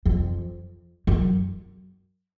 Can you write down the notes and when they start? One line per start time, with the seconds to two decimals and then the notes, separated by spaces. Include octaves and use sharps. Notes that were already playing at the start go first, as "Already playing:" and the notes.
0.05 F2
1.07 F#2